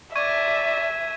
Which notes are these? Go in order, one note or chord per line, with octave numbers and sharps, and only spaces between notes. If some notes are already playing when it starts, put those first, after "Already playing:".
D5 E5 C#6 G#6 D#7